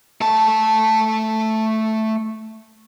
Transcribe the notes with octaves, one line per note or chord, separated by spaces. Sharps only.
A3 A5